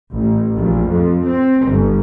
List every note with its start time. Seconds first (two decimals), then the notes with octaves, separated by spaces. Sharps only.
0.13 A1
0.56 A#1
0.88 F2
1.26 C4
1.68 G1